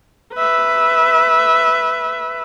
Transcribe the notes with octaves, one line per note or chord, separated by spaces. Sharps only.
B4 E5